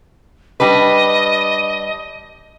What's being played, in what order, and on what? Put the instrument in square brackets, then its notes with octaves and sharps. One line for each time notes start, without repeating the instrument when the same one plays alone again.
[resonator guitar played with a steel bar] G3 D4 B4 [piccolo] D#5